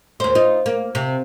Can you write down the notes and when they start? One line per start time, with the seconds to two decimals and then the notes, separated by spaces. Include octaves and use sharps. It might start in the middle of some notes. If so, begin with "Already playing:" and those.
0.20 D#2 C5
0.35 D#4 F4
0.66 A#3
0.95 C3